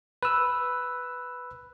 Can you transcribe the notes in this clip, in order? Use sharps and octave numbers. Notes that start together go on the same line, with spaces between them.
B4 E6